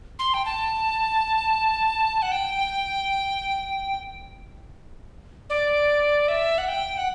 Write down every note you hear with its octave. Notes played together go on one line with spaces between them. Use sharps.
C6
G5
A5
F#5
G5
D5
E5
F#5
G5
F#5